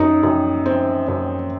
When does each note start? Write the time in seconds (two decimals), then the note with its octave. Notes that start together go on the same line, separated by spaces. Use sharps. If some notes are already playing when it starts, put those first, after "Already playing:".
Already playing: F#2 D#4
0.23 F#2
0.66 C4
1.08 F#2